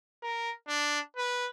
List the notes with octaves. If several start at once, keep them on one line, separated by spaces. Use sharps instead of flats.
A#4
D4
B4